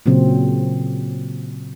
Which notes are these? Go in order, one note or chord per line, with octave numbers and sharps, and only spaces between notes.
A#2 C#3 F#3 C4